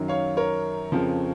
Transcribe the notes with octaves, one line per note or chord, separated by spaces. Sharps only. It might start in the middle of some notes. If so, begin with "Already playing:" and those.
Already playing: F#2 D#3 F#3
C#5 F5
A#4 C#5
F2 C#3 F3